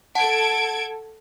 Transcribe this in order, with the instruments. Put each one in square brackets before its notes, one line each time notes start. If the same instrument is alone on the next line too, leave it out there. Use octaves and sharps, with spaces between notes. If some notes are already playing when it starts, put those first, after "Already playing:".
[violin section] A4 G#6 D7 [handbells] F#5 A5